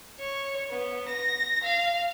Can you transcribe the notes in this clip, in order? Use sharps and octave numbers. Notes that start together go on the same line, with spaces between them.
C#5
B3
A#6
F5